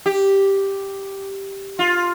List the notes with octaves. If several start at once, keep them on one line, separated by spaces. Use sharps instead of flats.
G4
F4